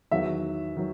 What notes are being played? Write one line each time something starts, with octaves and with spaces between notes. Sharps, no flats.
E2 D#3 F#3 E5
D#3 F#3